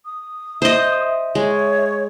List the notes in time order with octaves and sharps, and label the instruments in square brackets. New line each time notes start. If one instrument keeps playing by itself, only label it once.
[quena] D#6
[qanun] C5 D#5 [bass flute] E5
[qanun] G#3 [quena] C#5